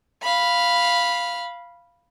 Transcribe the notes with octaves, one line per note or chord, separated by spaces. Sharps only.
F5 B5